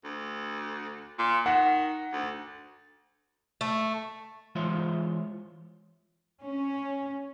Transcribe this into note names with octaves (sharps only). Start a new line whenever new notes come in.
D2
A#2
D#3 F#5
D2
A3
E3 G#3 F4 C5 C#5 E5
C#4